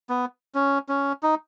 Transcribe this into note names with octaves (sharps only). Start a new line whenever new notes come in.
B3
C#4
C#4
D#4